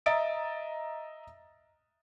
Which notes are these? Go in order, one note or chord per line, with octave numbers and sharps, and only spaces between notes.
D#5 E5 A#5 D#6 A6 D7